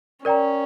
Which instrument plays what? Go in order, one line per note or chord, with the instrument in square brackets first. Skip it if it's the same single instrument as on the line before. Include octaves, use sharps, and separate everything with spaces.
[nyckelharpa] C#4 [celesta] A#4 D5 G5 A#5